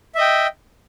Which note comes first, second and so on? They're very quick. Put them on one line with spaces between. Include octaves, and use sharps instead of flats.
E5 D#5 G5